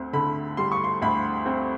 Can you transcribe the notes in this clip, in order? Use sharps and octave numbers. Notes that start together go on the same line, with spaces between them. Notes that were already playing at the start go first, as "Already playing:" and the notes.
Already playing: D2 C4
D3 B5
G3 C6
C#6
C6
D2 B5
C4